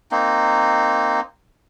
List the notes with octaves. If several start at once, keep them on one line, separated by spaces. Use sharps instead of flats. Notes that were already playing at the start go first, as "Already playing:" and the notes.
A#3 C4 D#4